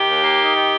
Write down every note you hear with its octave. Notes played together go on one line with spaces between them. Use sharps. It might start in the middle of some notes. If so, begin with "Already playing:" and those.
Already playing: D#3 G4
D#2
A#3
D#4
D#3